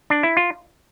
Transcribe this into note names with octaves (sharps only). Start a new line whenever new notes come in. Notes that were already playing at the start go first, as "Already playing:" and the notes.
D4
E4
F4